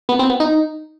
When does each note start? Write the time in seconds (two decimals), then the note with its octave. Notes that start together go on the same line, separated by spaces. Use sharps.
0.09 B3
0.19 C4
0.30 B3
0.40 D#4